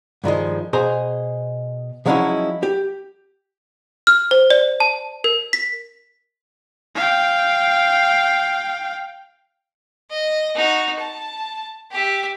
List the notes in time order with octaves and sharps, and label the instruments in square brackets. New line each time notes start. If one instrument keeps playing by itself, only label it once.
[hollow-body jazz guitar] G2 D#3 F3 G#3
B2 G#4 C5 A#5
F3 F#3 G#3 C#4 D#4 E4
G4
[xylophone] F6
C5
D5
A5
A#4
B6
[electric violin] F5 G5
[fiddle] D#5
D#4 F#4
A5
G4 E5